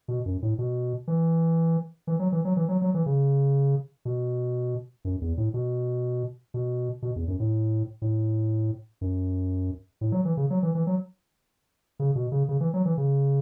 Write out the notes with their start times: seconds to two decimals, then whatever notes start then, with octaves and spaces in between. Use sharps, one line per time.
0.08 B2
0.26 F#2
0.42 A2
0.59 B2
1.08 E3
2.07 E3
2.19 F#3
2.32 E3
2.45 F#3
2.57 E3
2.69 F#3
2.82 F#3
2.94 E3
3.06 C#3
4.05 B2
5.05 F#2
5.21 E2
5.37 A2
5.54 B2
6.54 B2
7.02 B2
7.16 E2
7.28 F#2
7.40 A2
8.02 A2
9.01 F#2
10.01 A2
10.12 F#3
10.25 E3
10.37 C#3
10.50 F#3
10.63 E3
10.75 E3
10.87 F#3
11.99 C#3
12.15 B2
12.32 C#3
12.49 C#3
12.60 E3
12.74 F#3
12.85 E3
12.98 C#3